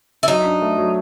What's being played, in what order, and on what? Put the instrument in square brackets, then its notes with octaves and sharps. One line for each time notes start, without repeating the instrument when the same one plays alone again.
[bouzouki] E4
[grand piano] F#3 [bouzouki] D#4
[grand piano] D4
A3
F#3